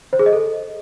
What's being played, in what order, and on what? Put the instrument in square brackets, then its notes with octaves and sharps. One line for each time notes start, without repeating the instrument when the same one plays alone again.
[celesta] C5
G#4
D#5
A4